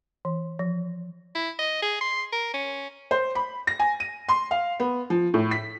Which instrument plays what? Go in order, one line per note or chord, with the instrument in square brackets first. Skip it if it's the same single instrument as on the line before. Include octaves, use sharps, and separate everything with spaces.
[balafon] E3
F3
[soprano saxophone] E4
D#5
G#4
C6
A#4
C#4
[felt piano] C5
B5
A#6
G#5
D#7
C6
F5
B3
F3
A2
B6